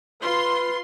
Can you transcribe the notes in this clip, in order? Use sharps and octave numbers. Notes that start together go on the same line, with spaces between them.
F4 B4 C6